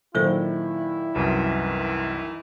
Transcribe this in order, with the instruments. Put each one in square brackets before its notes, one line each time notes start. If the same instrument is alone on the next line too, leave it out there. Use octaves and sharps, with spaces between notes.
[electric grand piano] A#2 D#3 [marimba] F#3 A4 C5 [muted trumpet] E4
[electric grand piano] C2 F#2 [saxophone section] D#3 E3